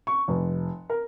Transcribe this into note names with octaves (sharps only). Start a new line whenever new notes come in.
C#6
F1
A#4